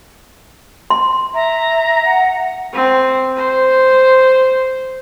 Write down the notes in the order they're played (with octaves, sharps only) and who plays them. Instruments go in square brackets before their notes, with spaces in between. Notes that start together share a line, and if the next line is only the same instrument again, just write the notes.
[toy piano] C6
[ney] E5 [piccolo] A#5
[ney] F#5
[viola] C4
C5